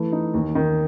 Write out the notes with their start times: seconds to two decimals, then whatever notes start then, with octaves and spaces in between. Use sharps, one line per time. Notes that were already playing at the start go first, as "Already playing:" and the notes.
Already playing: E3 A3
0.12 D#4
0.34 D#2
0.55 D#3